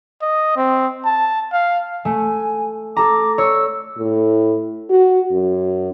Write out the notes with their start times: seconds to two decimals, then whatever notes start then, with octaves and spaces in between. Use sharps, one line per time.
0.22 D#5
0.57 C4
1.05 A5
1.52 F5
2.05 A3 G#5
2.97 A4 A#5 D6
3.38 C#5 E6
3.98 A2
4.89 F#4
5.32 F#2